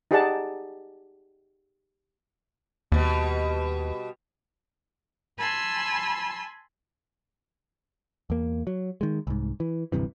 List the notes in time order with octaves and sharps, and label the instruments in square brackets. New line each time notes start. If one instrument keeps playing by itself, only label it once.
[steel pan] D#4 G4 G#4 D5 F#5 A5
[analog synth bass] D#2 [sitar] B2 G3
[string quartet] G#5 A5 B5 C6 E6
[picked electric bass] E2 A#3
F#3
D#3 G#3
C2 G#2
E3
D1 G2 C3 E3